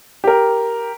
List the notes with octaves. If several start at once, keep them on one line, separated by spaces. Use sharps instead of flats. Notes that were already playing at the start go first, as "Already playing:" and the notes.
G4 A#4